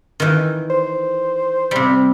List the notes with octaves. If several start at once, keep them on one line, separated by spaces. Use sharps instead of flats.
D#3 E3
C5
C3 G3